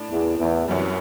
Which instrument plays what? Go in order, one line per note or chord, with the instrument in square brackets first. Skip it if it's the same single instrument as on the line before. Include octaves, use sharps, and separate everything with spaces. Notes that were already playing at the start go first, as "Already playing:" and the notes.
Already playing: [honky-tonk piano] A2 D4
[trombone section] E2
E2
[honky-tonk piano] C2 C3 E3 G3 [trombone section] F#2